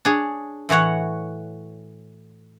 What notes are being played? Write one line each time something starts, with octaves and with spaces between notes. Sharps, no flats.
D4 G#4 C#5
A2 E3 F#4 C#5 F#5